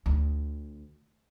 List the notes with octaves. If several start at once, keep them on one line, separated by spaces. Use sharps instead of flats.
D2